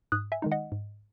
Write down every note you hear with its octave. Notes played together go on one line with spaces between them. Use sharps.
G#2 D#6 F#6
E5 G#5
D#3 G#3 D#4
D#5 F#5
G#2